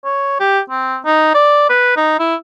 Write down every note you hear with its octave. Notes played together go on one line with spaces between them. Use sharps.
C#5
G4
C4
D#4
D5
B4
D#4
E4